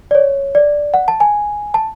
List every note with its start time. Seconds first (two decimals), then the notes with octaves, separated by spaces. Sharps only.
0.11 D5
0.15 C#5
0.55 D5
0.94 F#5
1.08 A5
1.20 G#5
1.74 A5